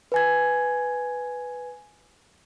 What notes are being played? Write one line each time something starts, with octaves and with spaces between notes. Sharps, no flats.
B4 G#5 G#6